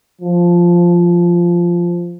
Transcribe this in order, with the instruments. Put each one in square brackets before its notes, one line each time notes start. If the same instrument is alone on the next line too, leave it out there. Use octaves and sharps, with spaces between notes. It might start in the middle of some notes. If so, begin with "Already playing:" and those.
[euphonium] F3